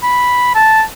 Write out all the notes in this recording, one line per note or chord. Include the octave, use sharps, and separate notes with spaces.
B5
A5